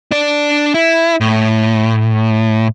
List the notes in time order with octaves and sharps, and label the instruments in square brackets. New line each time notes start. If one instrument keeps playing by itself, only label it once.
[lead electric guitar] D4 D5
E4
A2